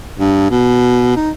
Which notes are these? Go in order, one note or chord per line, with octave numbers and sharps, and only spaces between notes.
G2
B2
D#4